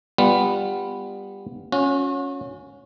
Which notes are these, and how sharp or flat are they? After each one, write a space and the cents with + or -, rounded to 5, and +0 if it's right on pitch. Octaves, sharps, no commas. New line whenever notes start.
G3 +15 B3 +0 F4 +0
C#4 +0 F#4 -40